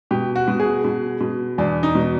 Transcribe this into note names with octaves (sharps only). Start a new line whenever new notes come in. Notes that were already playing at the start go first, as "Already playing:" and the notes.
B2 G4
F#4
B2
G#4
B2
B2
E2 D4
D#4
B2